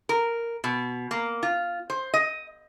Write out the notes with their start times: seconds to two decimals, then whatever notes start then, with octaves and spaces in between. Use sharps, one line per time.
0.09 A#4
0.64 B2
1.11 A#3
1.43 F4
1.90 C5
2.14 D#5